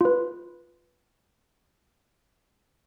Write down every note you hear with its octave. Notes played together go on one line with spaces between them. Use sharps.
F4 B4